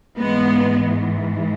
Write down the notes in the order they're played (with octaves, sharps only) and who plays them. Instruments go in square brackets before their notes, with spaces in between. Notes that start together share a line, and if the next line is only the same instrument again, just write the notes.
[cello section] G#2 E3 G#3 B3